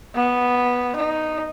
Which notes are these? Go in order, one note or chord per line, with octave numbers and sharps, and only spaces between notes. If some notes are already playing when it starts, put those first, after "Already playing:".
B3
D#4